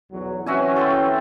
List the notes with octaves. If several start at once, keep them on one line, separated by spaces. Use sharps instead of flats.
B1 E2 F#3
E3 C4 C#4 F#4 E5 G#5
A4 G5 C6